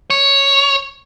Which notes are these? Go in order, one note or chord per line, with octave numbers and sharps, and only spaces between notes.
C#5